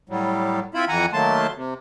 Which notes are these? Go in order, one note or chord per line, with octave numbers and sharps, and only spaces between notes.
A2 F#3 G3
C4 E4 F4 E5 B5
F2 E3 F#5 G#5 A#5
D#3 F#3 A3 A#3 A5 C6
C3